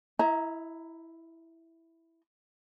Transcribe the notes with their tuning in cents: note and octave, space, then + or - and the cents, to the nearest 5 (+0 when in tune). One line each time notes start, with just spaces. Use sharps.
E4 +0 D#5 +45 A#5 +0